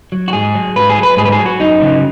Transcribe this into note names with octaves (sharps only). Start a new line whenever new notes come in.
F#3
F#4
G#2 G#4
F#3
G#2 B4
G#4
F#3
B4
G#2 G#4
B4
G#4
F#3
F#4
F#2 D#4
C#3 F#3